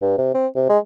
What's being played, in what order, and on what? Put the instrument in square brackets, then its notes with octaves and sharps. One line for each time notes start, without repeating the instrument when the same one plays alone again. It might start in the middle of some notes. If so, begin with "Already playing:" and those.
[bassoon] G2
C3
C4
C3
G#3